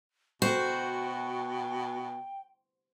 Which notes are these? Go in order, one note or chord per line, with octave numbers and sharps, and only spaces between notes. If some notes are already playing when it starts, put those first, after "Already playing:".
B2 F#4 C5 G5